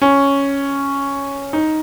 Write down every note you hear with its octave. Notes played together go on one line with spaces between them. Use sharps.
C#4
D#4